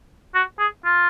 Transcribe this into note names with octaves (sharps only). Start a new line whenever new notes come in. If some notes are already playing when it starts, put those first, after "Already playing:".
F#4
G#4
F4